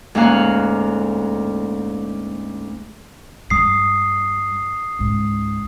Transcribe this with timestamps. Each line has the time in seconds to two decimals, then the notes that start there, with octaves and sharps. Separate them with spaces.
0.15 D2 G#2 A#3 C#4 F5 F#6
3.50 G2 G3 D#6 C7
4.99 C#2 G#2